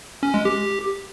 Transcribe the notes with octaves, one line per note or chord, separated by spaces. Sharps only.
C#4
G#3
G4